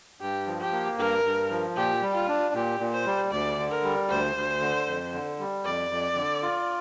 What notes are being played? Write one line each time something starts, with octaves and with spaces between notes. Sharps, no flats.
G2 G4
F3
G4
A#3
G2 A#4
G2
F3
A#2 G4
G3
F4
D4
A#2 G4
A#2
C5
G3
D2 D5
D3
A#4
G3
D2 C5
D2
D3
F2
D3
G3
F2 D5
F2
D3
F4